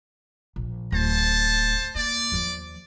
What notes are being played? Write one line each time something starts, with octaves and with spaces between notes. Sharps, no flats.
A#1
D1 C5 A5
A#3 D5
D#2 F3